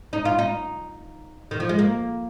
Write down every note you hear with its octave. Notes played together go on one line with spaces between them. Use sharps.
D#4
F4
D#4
D#3
F3
G#3
A#3